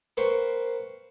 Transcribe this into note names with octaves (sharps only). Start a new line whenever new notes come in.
A#3 B4 C5 G5 C#6